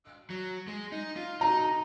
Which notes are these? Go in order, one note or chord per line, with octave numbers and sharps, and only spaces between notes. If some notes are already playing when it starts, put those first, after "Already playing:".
F#3
G#3
D#4
F4
D#4 A#5